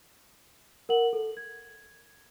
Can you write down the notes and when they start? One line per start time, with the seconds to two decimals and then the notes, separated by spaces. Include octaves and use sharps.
0.89 A#4 F#5 F#7
1.13 A4
1.37 G#6